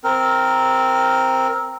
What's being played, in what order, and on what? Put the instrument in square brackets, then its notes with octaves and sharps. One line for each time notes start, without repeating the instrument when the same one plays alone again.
[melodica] C4 A#4